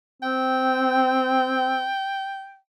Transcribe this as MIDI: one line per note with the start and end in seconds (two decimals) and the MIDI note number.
0.22 1.89 60
0.22 2.57 79